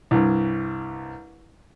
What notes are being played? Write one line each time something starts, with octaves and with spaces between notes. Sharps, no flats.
C2 G2